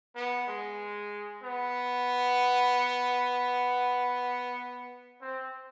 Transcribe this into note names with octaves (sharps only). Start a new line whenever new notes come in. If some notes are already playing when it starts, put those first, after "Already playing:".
B3
G#3
B3
C4